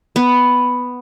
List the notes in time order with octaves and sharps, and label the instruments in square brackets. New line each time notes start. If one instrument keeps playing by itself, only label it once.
[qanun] B3